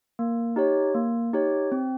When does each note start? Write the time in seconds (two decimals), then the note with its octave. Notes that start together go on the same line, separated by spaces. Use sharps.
0.19 A#3
0.56 D#4 G4 C#5
0.94 A#3
1.33 D#4 G4 C#5
1.72 C4